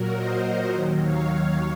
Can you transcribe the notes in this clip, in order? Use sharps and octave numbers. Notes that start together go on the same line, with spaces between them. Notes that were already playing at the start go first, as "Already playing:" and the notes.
Already playing: A#2 F#3 F#4 A#4
C5 D#5
D#2 D#3 F#3
C#5 F5